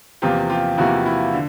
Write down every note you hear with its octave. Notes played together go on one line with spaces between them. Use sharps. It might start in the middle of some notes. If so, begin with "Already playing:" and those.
E2 C3 F3 A#3 F4 G4
F4 G4
E2 C3 F3 A#3 E4 F#4
E4
D3